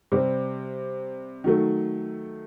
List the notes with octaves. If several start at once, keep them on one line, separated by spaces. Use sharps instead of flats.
C3 G3 C4
D#3 F#3 A3